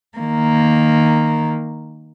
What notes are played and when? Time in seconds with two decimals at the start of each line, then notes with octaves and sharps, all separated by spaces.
0.18 D#3 A#3